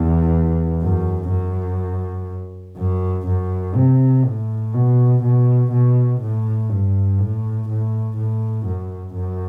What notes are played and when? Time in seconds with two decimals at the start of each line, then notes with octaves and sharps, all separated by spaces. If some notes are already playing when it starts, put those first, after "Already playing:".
Already playing: E2
0.82 F#2
1.30 F#2
2.77 F#2
3.27 F#2
3.75 C3
4.25 A2
4.74 B2
5.23 B2
5.72 B2
6.20 A2
6.69 G2
7.19 A2
7.68 A2
8.17 A2
8.66 F#2
9.15 F#2